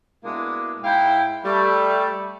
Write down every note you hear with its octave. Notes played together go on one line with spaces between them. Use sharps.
B2 G#3 A#3 D4 E4
G#2 E4 F5 G5
G3 A3